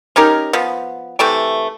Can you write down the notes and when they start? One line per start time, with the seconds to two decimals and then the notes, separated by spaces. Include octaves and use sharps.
0.16 C#4 D#4 G4 A#4
0.53 F3 B3
1.19 C3 E3 A3 G5